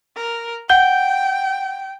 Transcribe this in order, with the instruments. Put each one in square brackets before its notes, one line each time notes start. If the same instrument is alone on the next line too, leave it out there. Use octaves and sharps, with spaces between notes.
[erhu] A#4
[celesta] F#5 G6 G7 [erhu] G5